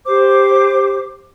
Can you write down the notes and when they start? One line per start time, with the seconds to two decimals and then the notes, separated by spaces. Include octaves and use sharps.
0.05 G4 C5 D6